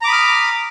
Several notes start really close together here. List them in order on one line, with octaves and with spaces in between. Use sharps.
A#5 D6 B5 D#6 F6